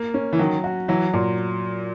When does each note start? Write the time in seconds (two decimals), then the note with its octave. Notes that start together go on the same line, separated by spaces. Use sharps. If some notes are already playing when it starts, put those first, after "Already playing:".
Already playing: A#3
0.14 C#4
0.33 E3
0.39 D#3 F#3
0.64 F#4
0.88 E3 F#3
1.14 A#2